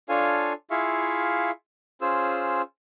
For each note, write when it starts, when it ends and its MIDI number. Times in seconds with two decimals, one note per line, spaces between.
0.09 0.53 62
0.09 0.53 65
0.09 0.53 69
0.09 0.53 73
0.09 0.53 77
0.09 0.53 80
0.71 1.51 64
0.71 1.51 65
0.71 1.51 68
0.71 1.51 76
0.71 1.51 77
0.71 1.51 85
2.01 2.62 61
2.01 2.62 65
2.01 2.62 68
2.01 2.62 72
2.01 2.62 88